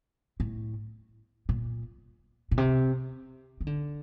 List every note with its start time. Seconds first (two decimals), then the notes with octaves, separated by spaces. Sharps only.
0.40 A2
1.49 A#2
2.51 A#2
2.58 C3
3.61 D#3
3.67 D3